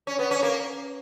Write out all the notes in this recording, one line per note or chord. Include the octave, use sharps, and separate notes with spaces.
C#4
B3
C#4
A#3